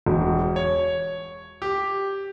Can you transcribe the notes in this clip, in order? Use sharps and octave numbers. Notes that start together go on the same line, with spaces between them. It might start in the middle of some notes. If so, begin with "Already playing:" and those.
E1
C#5
G4